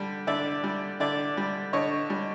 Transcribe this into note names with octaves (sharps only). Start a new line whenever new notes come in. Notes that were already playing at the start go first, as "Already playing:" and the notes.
Already playing: D3 G3
D3 D5 E5
G3
D3 D5 E5
G3
D3 C#5 D#5
G3